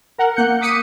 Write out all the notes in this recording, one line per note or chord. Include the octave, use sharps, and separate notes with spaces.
A#4 F#5
A#3 F#6 G6 C#7
D6 D#6 B6 C#7 D#7